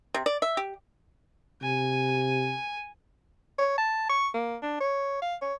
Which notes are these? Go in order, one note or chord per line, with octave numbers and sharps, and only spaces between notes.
C3
D5
E5
G4
C3 G#5
C#5
A5
C#6
A#3
D4
C#5
F5
C#5